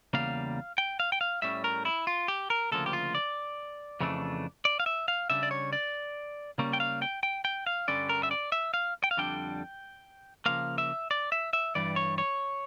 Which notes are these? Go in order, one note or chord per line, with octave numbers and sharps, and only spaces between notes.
E2 C#3 G3 A#3 F5
G5
F5
G5
F5
A2 G3 C#4 E5
A#4
E4
F4
G4
A#4
D2 C#3 F3 A#3 A4
G4
F4
D5
F2 C#3 E3 A3 D4
D5
F5
E5
F5
C#3 G3 D4 E5
D5
C#5
D5
C#3 G3 A#3 C#4
G5
F5
G5
G5
G5
F5
G2 D3 G3 C#4 D5
A#4
E5
D5
E5
F5
G5
F5
F2 D3 G3 D4 G5
C#3 F3 A#3 F5
E5
D5
E5
E5
G2 E3 G3 D5
C#5
C#5